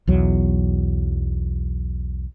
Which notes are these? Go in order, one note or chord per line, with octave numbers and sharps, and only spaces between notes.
B1 E2 F#3